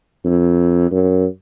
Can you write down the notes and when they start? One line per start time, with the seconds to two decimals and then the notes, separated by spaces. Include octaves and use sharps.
0.25 F2
0.91 F#2